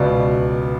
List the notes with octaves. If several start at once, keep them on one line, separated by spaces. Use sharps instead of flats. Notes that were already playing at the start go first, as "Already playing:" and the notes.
Already playing: C#2 B2 D5